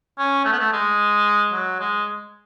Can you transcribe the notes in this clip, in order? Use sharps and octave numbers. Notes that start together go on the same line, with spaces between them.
C#4
A3
B3
A3
G#3
F#3
G#3